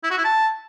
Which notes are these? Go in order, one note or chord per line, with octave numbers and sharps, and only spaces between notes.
E4
F#4
E4
A5